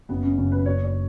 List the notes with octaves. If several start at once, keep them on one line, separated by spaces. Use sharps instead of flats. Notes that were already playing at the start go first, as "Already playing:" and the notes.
F#1 B3
C#4
F#2 C#3 C#4
B4
F#1 C#5
C#5